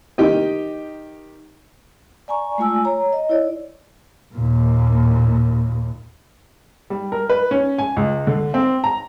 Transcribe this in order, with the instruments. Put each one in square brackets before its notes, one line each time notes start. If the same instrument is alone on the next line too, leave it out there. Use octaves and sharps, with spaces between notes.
[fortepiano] D#3 G4 D#5
[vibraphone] D5 G#5 A#5 C#6
G#3 A3 F4 G#5 E6
C#5 A#5
D#5
E4 C#5 D5
[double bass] D#2 A#2
[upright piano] G3
A#4
B4
C#4
G#5
C#2
D3
C4
A#5